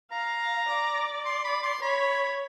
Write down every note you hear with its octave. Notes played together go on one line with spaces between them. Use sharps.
F5 A#5
D5
C6
B5
C6
C#5 B5